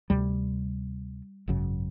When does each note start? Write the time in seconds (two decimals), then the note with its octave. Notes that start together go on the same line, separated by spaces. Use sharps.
0.10 D2 C3 G3
1.48 G#1 F#2 C#3